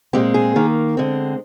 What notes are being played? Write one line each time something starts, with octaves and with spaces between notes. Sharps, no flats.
A#2 G#3 C4 G4
G#4
D#3 A#3
D3 G#3 C4